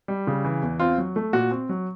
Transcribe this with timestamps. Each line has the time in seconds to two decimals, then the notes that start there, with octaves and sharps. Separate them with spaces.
0.08 G3
0.27 C#3
0.45 E3
0.62 E2
0.80 C4 F4
0.98 F#3
1.16 A3
1.33 A#2 F#4
1.51 C4
1.69 F#3